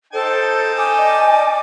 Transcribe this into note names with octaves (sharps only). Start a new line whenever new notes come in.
D#4 A4 C5 G5 A5
G#5 D6 D#6
D5 D#5 D6